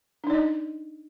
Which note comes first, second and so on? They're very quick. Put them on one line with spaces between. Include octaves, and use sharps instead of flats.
D4 D#4 D5 D#5